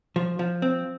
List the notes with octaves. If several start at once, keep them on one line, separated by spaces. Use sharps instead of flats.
F3
F3
C4